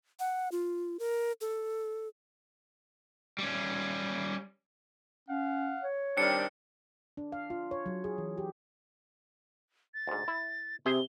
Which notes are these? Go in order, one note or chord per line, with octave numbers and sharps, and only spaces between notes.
F#5
F4
A#4
A4
G3 C#4
C#4 F5 F#5
C#5
D#3 G3 C4 D4 C#7
D4
F5
F4
C#5
F#3
G#4
E3
G4
A6
D2 G#2
E4
C3 G#4 C5 E5 G7